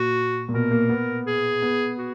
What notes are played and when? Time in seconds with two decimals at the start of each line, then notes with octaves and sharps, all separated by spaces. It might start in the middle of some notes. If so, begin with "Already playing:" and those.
Already playing: A#2 F#4
0.49 A#2
0.53 B2 A#4
0.71 A#3
0.89 B3
1.27 G#4
1.62 B3
1.99 F#4